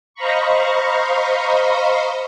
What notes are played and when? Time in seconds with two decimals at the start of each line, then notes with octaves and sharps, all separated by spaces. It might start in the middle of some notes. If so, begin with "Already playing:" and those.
0.14 C5 D#5 F5 A#5 B5 C#6